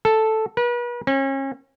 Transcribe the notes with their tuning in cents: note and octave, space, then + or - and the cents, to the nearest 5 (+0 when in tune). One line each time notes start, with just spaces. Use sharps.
A4 +0
B4 -40
C#4 -35